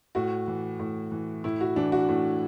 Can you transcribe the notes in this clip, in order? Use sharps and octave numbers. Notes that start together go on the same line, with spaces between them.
A2 F#4
E3
A2
E3
A2 E4
F#4
E3 D4
F#4
A2